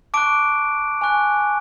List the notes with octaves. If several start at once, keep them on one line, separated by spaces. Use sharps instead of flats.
A5 C#6 D6 F#6 D7
G#5 C#6 F#6